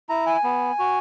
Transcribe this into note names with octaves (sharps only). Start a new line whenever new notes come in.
E4 A#5
G#5
B3
F#4